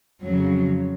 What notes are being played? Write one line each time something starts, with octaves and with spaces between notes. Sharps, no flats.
F2 C#3 F#3